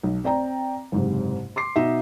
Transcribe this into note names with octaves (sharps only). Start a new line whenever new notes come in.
B1
C4 D5 G5 A#5
F#1 G#2 C3
C6 D6 C7
B2 D#4 E5